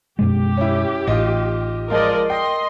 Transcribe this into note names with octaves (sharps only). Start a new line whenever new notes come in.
F#2 B2 G#3 G4
C#4 E4
A1 D#4 F4 D#5
F3 G#3 F4 A#4 D5 D#5
D#5 G5 C6